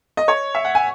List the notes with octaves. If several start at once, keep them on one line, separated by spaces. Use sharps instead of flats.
D#5
C#5
E5
F#5
G#5